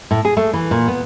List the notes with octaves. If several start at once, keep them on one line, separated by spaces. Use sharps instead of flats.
A2
G#4
A3
E3
A#2
B3